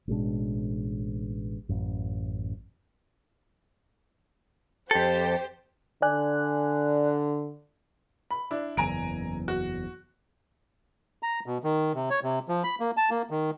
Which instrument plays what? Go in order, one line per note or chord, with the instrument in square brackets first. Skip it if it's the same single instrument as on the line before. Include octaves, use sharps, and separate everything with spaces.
[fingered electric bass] A1 B2 G#3 D4
A1 F#2
[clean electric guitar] F2 A4 [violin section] G4 C5
[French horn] D3 [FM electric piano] D5 G#5 F#6
[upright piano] B5
D4 E4
[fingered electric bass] F#1 E2 [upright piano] G#5 A#5 D7
[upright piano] F#4
[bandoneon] A#5
B2
D#3
C3
C#5
C3
F3
B5
A#3
A5
A#3
D#3